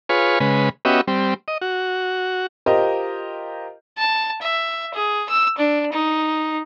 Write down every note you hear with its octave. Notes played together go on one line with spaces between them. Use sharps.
F4 G#4 B4 C#5
C#3 G#3 B4
B3 C#4 F#4 G4 D#5 E5
G3 C4
D#5
F#4
F4 G4 A#4 C5 D#5
A5
E5
G#4
E6
D4
D#4